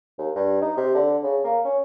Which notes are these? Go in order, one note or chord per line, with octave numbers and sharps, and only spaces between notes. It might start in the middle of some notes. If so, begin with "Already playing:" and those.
D#2
G2
D#4
C3
D3
C#3
A#3
C#4